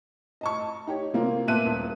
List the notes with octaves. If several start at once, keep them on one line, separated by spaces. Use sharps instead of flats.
D#5 A5 C#6
D#4 G4 C#5
C3 A#3 C4 F4
A#2 B3 E5 A5 F#6 D#7
D#1